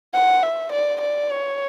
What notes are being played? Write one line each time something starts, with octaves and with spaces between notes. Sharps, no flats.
F#5
E5
D5
D5
C#5